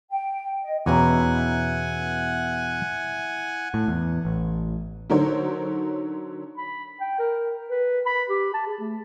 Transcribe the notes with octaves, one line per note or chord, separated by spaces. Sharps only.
G5
D#5
E2 B2 C#4 E4 E5 F#5 G#5 A#5
A2
E2
A1
D3 F#3 D#4 A#4 C5 C#5
B5
G5
A#4
B4
B5
G4
A5
G#4
A3